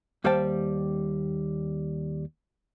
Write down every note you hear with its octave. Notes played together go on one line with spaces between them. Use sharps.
D#2 G3 C5 F5 G5 A5